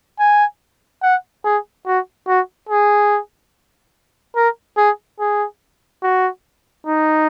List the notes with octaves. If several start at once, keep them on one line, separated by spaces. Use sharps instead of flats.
G#5
F#5
G#4
F#4
F#4
G#4
A#4
G#4
G#4
F#4
D#4